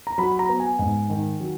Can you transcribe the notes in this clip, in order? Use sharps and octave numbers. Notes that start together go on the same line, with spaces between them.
A#5
F#3 B5
B5
A#5
B3
G#5
G#2
D#3
F#3